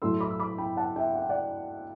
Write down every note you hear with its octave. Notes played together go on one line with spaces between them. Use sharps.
A2 F#3 A3 C6 E6
B5 D6
E6
B5 D6
G5 B5
F#5 A5
E5 G5
F#5
G5
D5 F#5